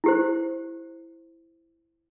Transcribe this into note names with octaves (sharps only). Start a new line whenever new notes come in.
E4 G4 C5